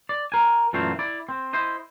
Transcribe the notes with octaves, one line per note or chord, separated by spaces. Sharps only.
D5
A#4 G#5
F#2 A#2 E3 A3 C4 F4
E4 D5
C4
E4 C5 D#5